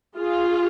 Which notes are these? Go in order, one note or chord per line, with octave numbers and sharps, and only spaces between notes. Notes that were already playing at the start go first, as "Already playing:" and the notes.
F4 G#4